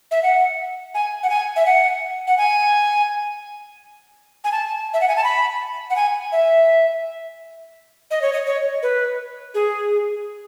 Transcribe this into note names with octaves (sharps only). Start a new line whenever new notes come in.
E5
F#5
G#5
F#5
G#5
E5
F#5
F#5
G#5
G#5
A5
E5
F#5
G#5
A5
B5
F#5
G#5
E5
D#5
C#5
D#5
C#5
B4
G#4